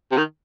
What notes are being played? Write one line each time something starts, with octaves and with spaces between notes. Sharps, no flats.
C3
D#3